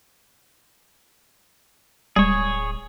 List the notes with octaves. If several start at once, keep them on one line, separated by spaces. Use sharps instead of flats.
D1 G3 G#3 G#4 C#5